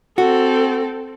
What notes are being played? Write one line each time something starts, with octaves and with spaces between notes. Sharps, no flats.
C4 F#4 A4